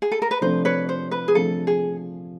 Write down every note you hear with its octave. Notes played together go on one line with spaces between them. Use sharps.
G#4
A4
A#4
B4
C3 F3 A3 D4 C5
B4 C#5
C5
B4
G#4
C3 F3 A3 D4 A4
G#4